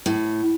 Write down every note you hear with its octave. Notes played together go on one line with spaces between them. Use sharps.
A2